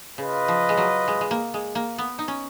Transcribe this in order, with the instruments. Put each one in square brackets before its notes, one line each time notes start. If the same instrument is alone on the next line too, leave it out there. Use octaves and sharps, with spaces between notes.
[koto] C#3 [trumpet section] F4 B4 D#5
[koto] F3
G#3
F#3
G#3
G#3
A#3
G#3
A#3
B3
D#4
C#4